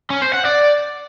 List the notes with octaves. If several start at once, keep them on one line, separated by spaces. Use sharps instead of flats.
C#4
C5
F#5
D5